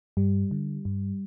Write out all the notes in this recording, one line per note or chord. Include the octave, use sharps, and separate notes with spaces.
G2 G3
D3
G2